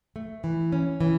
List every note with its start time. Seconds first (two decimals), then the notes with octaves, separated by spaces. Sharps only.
0.16 A3
0.44 E3
0.72 C#4
1.01 E3